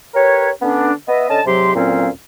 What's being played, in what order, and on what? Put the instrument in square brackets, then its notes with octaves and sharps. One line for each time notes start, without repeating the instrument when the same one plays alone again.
[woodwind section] G4 A#4 B4 C#5
D3 B3 C#4 D4
B3 D#5 E5
D3 C#4 D#5 A5
G#2 C3 F#3 G4 C6
D2 A#2 F#3 C4 C#4 F5